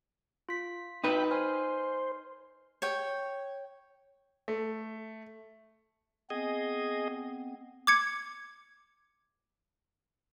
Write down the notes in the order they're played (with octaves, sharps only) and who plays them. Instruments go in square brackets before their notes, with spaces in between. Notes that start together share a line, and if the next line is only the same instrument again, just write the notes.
[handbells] F4 B6
[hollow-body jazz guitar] D#4 B4 [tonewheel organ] G5 B5
[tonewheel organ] C5 [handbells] G#5 F6
[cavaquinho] C#5 G5
[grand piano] A3
[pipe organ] B3 C4 [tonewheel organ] G#4 D#5
[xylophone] D6 G#6 C#7